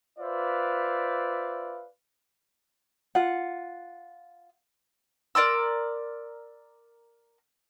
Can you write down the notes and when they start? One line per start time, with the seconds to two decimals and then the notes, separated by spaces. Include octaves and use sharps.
0.19 F4 B4 C5 D5 E5 F5
3.15 F4 F#5
5.35 A#4 D5 C6 E6